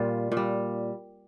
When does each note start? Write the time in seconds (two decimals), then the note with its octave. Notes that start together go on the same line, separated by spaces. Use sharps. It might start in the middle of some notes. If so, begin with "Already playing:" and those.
Already playing: A#2 G3 F4
0.32 A#2
0.37 G3